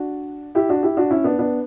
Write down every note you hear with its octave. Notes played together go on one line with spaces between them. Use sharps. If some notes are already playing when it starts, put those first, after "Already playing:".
Already playing: D4 F#4
E4 G4
D4 F#4
E4 G4
D4 F#4
C#4 E4
B3 D4
B3 D4